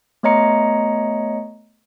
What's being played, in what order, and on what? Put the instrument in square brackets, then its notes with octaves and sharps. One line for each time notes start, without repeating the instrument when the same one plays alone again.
[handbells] A3 B3 C#5 D#5 A#5 C#7